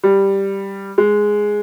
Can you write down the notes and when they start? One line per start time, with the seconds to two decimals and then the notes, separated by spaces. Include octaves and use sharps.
0.04 G3
0.98 G#3